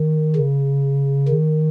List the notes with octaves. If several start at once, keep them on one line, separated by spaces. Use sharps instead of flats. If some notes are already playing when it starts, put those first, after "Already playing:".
Already playing: D#3
C#3
D#3